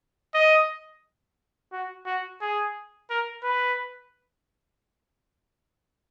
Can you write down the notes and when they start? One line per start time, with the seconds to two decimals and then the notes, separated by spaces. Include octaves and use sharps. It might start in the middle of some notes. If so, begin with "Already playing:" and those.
0.34 D#5
1.72 F#4
2.06 F#4
2.41 G#4
3.10 A#4
3.44 B4